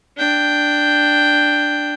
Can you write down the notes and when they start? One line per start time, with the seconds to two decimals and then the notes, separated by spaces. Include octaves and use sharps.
0.17 D4 G5